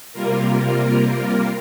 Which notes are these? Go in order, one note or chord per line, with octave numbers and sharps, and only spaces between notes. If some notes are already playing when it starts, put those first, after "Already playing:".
C3 G3 A#3 F4 A#4